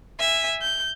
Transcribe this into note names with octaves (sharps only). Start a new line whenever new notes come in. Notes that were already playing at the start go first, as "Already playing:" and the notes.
E5 G#5
G6